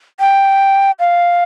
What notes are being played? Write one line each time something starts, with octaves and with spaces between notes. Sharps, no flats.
G5
F5